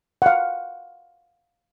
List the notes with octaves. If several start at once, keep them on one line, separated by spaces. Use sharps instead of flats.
F5 F#5